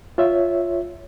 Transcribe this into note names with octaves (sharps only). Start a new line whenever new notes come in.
F4 C#5 E5